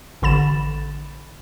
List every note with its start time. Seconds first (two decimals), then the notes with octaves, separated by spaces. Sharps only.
0.22 A1 D3 B5 A6 E7